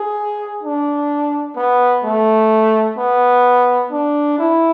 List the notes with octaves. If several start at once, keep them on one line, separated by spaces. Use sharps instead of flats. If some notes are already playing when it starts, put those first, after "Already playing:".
Already playing: G#4
D4
B3
A3
B3
D4
E4